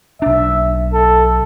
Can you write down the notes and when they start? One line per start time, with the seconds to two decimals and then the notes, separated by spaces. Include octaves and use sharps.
0.22 B1 D4 E5
0.94 A4